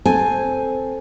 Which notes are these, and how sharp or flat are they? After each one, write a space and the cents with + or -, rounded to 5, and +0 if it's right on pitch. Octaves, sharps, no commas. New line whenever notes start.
C4 +0 A4 +0 G#5 +0